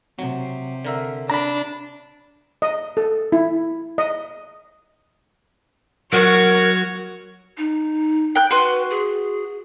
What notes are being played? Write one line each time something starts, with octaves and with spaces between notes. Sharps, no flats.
C3 F#3
D3 A#4 E5
D4 A#5 B5
D#5
A4
E4
D#5
F#3 F#4 A#4 C#5 G#6
D#4
G5 F#6
F#4 B4 C6
G#4